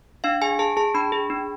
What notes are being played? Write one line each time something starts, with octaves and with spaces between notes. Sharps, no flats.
D4 F5
G#4 G#5
G#4 A5
G#4 A5
D4 B5
G#4
D4